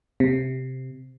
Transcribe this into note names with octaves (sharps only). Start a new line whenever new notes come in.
C3